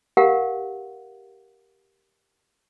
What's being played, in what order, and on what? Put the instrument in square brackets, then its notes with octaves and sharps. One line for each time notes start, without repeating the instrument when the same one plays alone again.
[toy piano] G4 A#4 F5 F#5